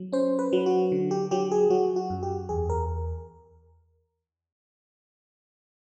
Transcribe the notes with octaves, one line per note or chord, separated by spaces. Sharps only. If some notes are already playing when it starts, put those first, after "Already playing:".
Already playing: F#3
C#4 C5
B4
F#3
F#4
D3
G4
F#3 G4
G#4
F#3 F#4
F#4
F#2
G4
E2 G#4
A#4